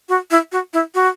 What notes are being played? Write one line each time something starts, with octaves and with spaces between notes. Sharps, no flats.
F#4
E4
F#4
E4
F#4